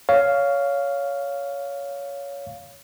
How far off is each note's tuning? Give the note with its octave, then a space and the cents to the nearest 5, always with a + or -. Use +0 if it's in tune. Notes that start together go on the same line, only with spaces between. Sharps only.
C#5 +20 F5 +0